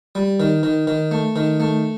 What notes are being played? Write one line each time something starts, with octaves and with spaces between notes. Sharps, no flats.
G3
D#3
D#3
D#3
A3
D#3
A3